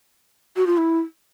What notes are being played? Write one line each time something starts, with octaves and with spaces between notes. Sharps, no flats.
F#4
F4
E4